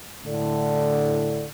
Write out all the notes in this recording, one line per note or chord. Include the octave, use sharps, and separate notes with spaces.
A2 D3